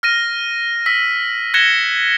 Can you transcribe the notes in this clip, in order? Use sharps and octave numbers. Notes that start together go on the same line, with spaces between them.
F6 A#6 D#7
E6 B6 F#7
F#6 G#6 A#6 C#7 E7 G7